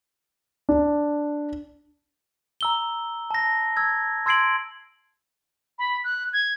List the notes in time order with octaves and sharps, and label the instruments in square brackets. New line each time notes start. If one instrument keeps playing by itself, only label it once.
[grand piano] D4
[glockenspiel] A#5 E6 G7
A5 A#6
E6 G#6
C6 E6 G#6 C7 D7 F#7
[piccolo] B5
F#6
G#6